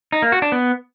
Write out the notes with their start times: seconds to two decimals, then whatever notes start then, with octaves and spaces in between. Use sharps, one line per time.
0.12 D#4
0.22 A#3
0.32 F#4
0.42 D4
0.52 B3